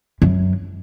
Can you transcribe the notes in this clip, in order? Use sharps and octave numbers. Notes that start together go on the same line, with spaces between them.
F#2